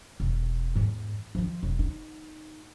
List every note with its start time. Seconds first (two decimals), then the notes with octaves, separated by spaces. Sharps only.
0.20 E1
0.75 E2 G#2
1.35 F3 F4
1.63 E1
1.79 D#4